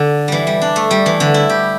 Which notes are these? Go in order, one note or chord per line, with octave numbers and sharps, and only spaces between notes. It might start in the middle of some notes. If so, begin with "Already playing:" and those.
Already playing: D3
E3 G3
G3
D4
A3
G3
E3
D3
E4
G4